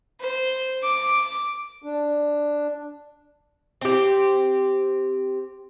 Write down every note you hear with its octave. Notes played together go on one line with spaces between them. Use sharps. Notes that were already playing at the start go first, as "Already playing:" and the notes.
C5
D6
D4
C4 G4